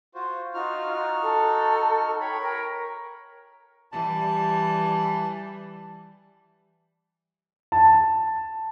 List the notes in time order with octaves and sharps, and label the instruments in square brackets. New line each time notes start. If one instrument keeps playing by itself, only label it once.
[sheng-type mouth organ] F4 F#4 C5
[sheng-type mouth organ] D#4 F#4 F6 [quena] F4
[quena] A4
[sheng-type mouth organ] C#5 B5 [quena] G5
[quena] A#4
[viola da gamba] E3 G3 [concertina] A5
[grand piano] A5